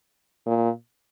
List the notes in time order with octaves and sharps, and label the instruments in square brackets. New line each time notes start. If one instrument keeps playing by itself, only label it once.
[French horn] A#2